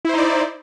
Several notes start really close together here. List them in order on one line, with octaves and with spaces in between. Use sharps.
E4 C5 D#4 D5